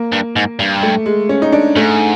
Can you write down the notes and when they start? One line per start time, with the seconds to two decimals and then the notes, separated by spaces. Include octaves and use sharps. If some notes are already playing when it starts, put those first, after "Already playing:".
Already playing: A#3
0.12 G2
0.36 G#2
0.59 G2
0.83 A3
1.06 G#3
1.29 C#4
1.42 D#4
1.52 D4
1.76 G#2 A3